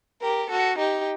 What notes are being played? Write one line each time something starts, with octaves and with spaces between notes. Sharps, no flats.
G4 A#4
F#4 A4
D#4 G4